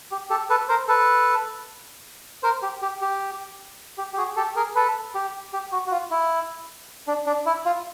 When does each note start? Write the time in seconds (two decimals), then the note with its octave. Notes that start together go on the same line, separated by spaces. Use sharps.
0.11 G4
0.30 G4 A4
0.50 A4 B4
0.69 A#4 C5
0.88 A4 B4
2.43 A#4 C5
2.63 G4
2.82 G4
3.01 G4
3.98 G4
4.13 G4
4.17 F#4 G#4
4.36 G4 A4
4.56 G#4 A#4
4.75 A4 B4
5.15 G4
5.53 G4
5.72 F#4
5.87 F#4
5.91 F4
6.11 E4
7.08 D4
7.26 D4
7.46 E4
7.66 F4